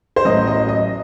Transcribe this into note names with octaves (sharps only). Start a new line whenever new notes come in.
C5
A1 A2 F#3 D#5
D#5
D#5